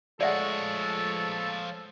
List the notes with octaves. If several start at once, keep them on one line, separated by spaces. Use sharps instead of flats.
F3 G#3 A3 A4 C#5 D5 E5 F#5